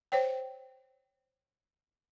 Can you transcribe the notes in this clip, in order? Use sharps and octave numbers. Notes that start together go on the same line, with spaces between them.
C5 C#5 G5